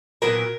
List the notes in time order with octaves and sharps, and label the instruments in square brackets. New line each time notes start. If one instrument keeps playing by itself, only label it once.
[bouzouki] A#2 F#3 B3 A#4